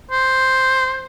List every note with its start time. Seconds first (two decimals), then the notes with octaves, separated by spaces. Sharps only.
0.11 C5